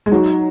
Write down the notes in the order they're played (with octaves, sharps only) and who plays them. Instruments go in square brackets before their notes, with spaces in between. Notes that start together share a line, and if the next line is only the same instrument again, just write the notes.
[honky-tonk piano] G#3
[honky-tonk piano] F#3 [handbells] D#4